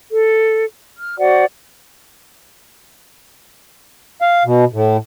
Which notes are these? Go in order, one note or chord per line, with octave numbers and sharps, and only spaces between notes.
A4
F6
F#4 C5 D5 F#5
F5
B2
A2